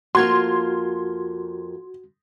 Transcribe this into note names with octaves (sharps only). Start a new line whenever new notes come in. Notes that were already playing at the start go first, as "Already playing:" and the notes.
F2 A#3 F4 F#4 C6 G#6